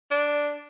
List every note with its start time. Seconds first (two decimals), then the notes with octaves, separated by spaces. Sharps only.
0.11 D4